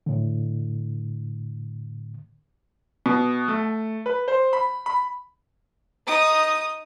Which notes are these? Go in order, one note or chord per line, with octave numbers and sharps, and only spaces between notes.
A2 D3
B2
A3
B4
C5
B5
B5
D#4 D#6